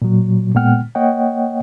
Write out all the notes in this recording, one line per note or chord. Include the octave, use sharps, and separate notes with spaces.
A#2 F#3
A#2 G#3 B3 F#5 G5 F6
A#3 C#5 D#5 F#5 G5